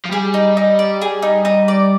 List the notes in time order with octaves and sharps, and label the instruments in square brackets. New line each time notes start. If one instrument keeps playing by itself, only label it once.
[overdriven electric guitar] F3
[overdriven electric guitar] G3 [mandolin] G#4
[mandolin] D#4
D#4
D5
G#4
D#4
D#4
D5